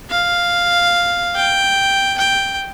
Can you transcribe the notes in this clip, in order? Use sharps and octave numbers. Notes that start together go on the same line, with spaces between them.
F5
G5
G5